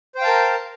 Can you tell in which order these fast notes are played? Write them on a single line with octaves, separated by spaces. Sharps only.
C5 G5 F5 A5 A#4